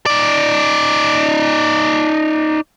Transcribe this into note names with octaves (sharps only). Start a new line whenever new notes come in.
D#4 D5